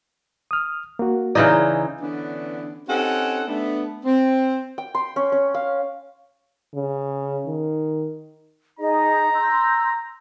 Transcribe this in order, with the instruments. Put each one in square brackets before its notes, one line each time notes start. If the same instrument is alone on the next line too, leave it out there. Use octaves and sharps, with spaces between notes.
[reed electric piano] D#6 F6
A#3 F#4
[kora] C#3 E3 D#4 [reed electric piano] D5 A#5 G6
[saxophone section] D3 E3 B3 C#4 D4
C4 C#4 D#4 G4 A4 F#5
A3 B3 D4
C4
[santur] G5
C6
C#4
C#4
F5
[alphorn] C#3
D#3
[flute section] D#4 G#4 D#5 [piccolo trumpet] A#5
[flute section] C6 E6 G6